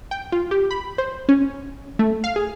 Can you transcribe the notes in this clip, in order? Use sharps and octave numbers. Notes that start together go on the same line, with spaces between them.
G5
F4
G4
B5
C5
C#4
A3
F5
G#4